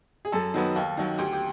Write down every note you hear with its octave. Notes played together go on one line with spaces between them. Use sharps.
G#4
F#2 A4
D#3 F#3 B3
D#2
D#3 F#3
D2 G4
G4